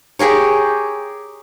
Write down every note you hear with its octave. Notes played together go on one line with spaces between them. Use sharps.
G4 G#4 A#4 C#5